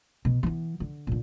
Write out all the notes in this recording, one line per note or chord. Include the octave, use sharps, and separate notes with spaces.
B2
E3 B3
D3
A#2 D3